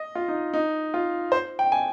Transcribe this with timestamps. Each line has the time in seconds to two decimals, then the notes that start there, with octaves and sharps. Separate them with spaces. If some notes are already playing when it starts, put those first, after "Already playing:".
Already playing: D#5
0.15 F4
0.28 D#4
0.54 D#4
0.94 F4
1.32 C5
1.59 G5
1.72 G#5